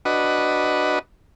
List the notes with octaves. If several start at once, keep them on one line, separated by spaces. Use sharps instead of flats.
D4 F#4 B4 D#5